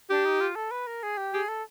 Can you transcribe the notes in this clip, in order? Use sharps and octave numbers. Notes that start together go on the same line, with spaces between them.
D4 G4
D#4
F4
A4
B4
A#4
G#4
G4
G4 G#4
A4